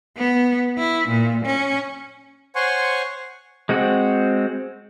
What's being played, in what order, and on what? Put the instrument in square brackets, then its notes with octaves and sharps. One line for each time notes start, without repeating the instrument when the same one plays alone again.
[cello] B3
E4
A#2
C#4
[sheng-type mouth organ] C5 C#5 F#5 G#5 C6 C#6
[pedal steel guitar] G#3 C4 F#4